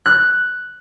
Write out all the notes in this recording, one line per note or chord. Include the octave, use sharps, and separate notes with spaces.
F#6